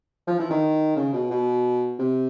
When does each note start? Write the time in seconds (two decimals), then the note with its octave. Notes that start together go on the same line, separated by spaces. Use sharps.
0.27 F3
0.40 E3
0.50 D#3
0.96 C#3
1.14 B2
1.31 B2
1.99 C3